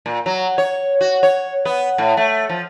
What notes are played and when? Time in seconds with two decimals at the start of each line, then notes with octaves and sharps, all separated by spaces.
0.06 A#2
0.26 F#3
0.58 C#5
1.01 F#4
1.23 C#5
1.65 B3
1.98 A2
2.17 A3
2.50 F3